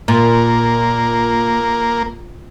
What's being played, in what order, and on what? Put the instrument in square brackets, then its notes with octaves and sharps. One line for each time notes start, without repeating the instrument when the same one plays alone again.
[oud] A#2 [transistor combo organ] A#3